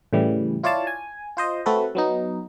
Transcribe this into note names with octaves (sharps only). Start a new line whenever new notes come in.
A2 C#3 E3 G3
E4 F4 C#5 D5 F5 A5
G#5
F4 C5 D#5
A3 C4 F#4 A4 B4
F#3 B3 D#4